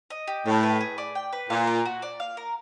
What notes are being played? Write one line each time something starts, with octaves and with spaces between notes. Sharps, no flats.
D#5
G4
A2 G5
B4
G#4
D5
G5
B4
A#2 F5
A#4
F#4
D5
F5
A#4